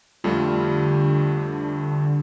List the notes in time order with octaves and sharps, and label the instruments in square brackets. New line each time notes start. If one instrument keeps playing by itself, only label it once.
[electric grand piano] F2 A3 [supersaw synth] D3 [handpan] G3 F4